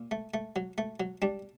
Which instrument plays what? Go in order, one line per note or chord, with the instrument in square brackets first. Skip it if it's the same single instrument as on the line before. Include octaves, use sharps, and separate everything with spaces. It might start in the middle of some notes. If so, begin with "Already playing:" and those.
Already playing: [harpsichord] A#2
A3
A3
F#3
A3
F#3
G3 D4